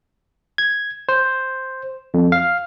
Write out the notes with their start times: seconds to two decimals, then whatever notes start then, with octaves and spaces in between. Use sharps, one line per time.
0.58 G#6
1.09 C5
2.14 F2
2.32 F5